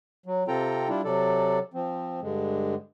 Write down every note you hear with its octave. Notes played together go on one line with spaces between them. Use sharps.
F#3
C3 C4 F4 A4 G5 A#5
G3 D4 E4 F4
C3 F#3 A4 D5
F3 C4
G2 D3 G#3